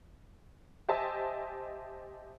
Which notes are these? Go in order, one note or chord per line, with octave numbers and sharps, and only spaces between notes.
G4 C5 D#5 E5 G#5 A5